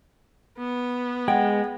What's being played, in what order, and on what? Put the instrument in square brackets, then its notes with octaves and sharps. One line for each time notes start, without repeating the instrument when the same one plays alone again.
[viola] B3
[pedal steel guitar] G#3 [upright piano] F#5 [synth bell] G5